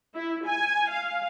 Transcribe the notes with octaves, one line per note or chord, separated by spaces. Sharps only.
E4
G#5
F5